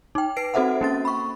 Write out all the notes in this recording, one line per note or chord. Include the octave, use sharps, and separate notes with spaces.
D#4 G5
B4 C7 D7
C4 F#4 A4 C5 E5 F#5
A#3 C#4 A6
B5 C#6